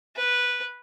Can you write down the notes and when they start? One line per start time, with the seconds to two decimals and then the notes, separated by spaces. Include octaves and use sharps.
0.16 B4